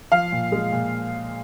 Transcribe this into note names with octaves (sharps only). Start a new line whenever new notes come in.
F3 F5 F6
A#2
G#3
A#2